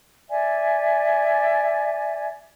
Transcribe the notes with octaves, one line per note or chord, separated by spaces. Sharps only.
D5 E5 G#5